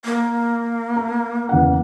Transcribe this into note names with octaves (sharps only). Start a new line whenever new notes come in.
A#3
A#5
E2 C#3 F#5